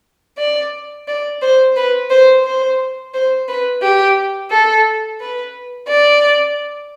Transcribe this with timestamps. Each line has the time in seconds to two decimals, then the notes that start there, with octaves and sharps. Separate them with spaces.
0.38 D5
1.08 D5
1.42 C5
1.76 B4
2.10 C5
2.44 C5
3.14 C5
3.48 B4
3.82 G4
4.51 A4
5.20 B4
5.88 D5